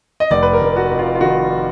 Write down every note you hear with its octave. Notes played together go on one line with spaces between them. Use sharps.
D#5
F1 D5
B4
A#4
F1
F#4
F2
F4
F4
D#3 F#4